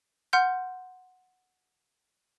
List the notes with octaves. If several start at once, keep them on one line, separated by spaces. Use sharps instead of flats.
F#5 C6 F6 G6